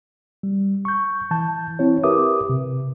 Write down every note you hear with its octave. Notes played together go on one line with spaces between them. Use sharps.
G3
C#6 G6
E3 A5 G6
C4 E4 C#5
G4 A#4 B4 E5 D6 D#6
C3